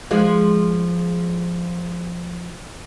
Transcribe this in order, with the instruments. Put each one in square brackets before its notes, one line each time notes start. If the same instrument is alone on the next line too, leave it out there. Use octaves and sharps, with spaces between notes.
[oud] F3 G#3